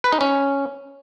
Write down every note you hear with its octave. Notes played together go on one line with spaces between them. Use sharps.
B4
D#4
C#4